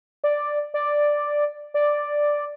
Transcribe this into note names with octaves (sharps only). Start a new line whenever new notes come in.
D5
D5
D5